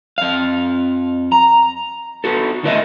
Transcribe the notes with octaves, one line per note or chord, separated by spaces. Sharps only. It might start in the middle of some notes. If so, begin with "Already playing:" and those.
F2 F5
A#5
B3 F#4 A4
D2 A2 F#4 A#4 D#5 E5